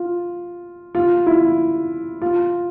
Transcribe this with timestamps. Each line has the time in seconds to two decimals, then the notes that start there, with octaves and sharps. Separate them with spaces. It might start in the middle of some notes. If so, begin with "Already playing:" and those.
Already playing: F4
0.95 F4
1.27 E4
2.22 F4